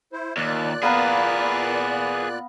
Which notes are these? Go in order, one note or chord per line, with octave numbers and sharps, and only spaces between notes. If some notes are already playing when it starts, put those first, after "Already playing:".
E4 C5
D#2 A#2 D5 F#6
B3 G#4 B4 F5 A#5